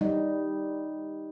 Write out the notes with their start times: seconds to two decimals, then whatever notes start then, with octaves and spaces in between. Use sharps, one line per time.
0.01 G3 D#4